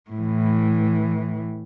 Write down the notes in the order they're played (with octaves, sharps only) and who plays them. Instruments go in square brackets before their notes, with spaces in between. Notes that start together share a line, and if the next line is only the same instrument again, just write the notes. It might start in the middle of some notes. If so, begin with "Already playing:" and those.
[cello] A2 E3